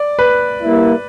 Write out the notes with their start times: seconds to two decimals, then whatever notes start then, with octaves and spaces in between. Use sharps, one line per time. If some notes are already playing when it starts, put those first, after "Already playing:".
Already playing: D5
0.19 B4
0.62 G3 A#3 E4